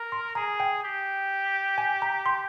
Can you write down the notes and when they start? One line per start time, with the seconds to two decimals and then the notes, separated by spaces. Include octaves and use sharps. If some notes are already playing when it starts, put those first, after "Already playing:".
Already playing: A#4
0.12 C6
0.35 G#4 A#5
0.60 G5
0.83 G4
1.78 G#5
2.02 A#5
2.26 C6